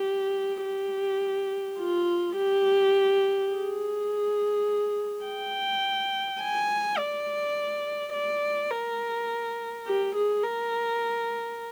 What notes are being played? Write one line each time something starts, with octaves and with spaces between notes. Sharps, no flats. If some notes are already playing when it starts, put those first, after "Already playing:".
Already playing: G4
G4
F4
G4
G#4
G5
G#5
D5
D5
A#4
G4
G#4
A#4